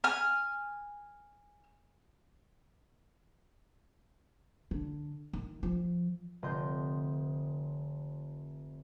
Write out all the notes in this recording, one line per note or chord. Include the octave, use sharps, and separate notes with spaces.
G#5 F6
D3
D#3
F3
F1 D3 D#5 C6 G6